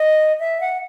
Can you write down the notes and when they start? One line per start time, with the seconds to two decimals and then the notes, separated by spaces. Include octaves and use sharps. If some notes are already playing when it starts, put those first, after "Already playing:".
Already playing: D#5
0.39 E5
0.60 F#5